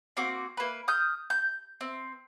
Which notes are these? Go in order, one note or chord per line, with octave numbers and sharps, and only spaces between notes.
A#3 C4 F#4 D6
A#3 B4
D#6 F6 G6
G6
C4